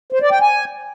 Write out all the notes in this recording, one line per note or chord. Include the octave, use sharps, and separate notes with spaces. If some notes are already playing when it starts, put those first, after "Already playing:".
C5
D5
G5
G#5